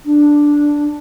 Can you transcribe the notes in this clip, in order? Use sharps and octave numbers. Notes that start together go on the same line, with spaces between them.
D4